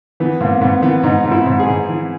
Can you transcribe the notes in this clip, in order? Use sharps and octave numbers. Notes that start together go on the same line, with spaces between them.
E3 B3
G#2 A#3
G#2 B3
E3 B3
G#2 D#4
G#2
E4
G#2
G#4
G#2
E3